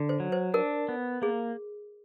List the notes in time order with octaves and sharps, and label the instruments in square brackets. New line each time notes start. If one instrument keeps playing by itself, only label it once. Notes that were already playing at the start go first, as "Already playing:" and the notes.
Already playing: [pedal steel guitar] D3
[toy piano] C5
[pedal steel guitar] F#3
[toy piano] C5
[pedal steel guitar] D4 [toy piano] A#4
[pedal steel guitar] B3
[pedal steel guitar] A#3 [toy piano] G#4